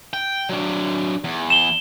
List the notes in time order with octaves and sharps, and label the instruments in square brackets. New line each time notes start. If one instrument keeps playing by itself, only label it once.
[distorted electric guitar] G5
F#3 D4
E2
[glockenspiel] E7 G7